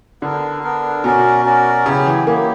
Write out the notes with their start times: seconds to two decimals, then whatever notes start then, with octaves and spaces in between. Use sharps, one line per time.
0.22 D3 B3 D4 A#4
0.63 B3 D4 A#4
1.04 B2 C#4 F#4 A#4 D5
1.45 C#4 F#4 A#4 D5
1.86 C#3 F#3 B3 E4 G4
2.07 E3
2.27 F#3 A#3 B3 E4 G4